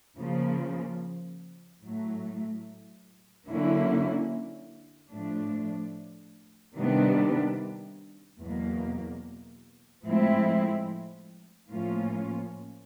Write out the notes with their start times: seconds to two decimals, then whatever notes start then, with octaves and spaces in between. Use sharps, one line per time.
0.19 C#3 F3 A#3
1.84 A2 F#3 A3
3.48 D3 F#3 A#3 C#4 E4
5.12 A2 F3 A3 D4
6.77 C3 D#3 G3 B3 D4
8.41 E2 B2 F#3 A#3
10.05 A2 F3 G#3 C4 E4
11.70 A2 F3 A#3 C#4 F4